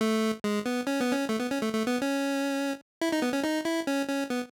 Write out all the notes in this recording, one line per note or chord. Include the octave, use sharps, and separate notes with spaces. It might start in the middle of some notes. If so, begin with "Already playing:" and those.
A3
G#3
B3
C#4
B3
C#4
A3
B3
C#4
A3
A3
B3
C#4
E4
D#4
B3
C#4
D#4
E4
C#4
C#4
B3